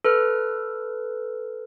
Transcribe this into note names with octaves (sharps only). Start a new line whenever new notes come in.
A4 B4 F6